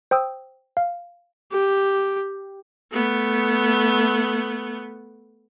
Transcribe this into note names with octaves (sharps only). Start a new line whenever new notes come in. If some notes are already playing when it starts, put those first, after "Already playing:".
C5 G5 D#6 E6
F5
G4
A3 B3